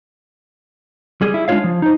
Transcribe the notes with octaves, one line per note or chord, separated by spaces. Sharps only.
G3 G#4
E4
G#3 D4 D#4 F4 C#5 F5
F3
D#4 C5